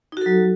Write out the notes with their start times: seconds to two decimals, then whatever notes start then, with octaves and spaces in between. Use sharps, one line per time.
0.12 D#4
0.17 F#4
0.21 A4
0.26 F#3